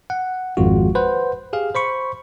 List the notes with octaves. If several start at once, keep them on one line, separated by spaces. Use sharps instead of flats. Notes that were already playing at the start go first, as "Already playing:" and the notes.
F#5
G#1 F2 G#3 F4 F#4
B4 C5 F#5
G4 G#4 F5
C5 B5 C#6